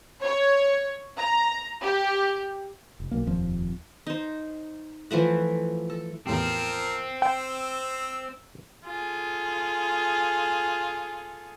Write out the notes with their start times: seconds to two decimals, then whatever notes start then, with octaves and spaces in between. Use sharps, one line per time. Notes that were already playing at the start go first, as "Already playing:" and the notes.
0.24 C#5
1.18 A#5
1.83 G4
3.00 F1
3.11 B1 A#3
3.26 D#1 F2 F3 C4
4.07 D#4 C5
5.11 E3 F3 A3 F#5
5.90 A4
6.27 E2 A2 F3 C4 G4 A#4
7.22 C5 G5 E6
8.85 F4 G#4 A4